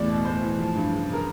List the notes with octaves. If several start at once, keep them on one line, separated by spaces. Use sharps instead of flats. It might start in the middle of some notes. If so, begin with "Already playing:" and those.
Already playing: E2 A2 D5
B2
A2 C5
E3
F3
G2
C#3
C#3 A#4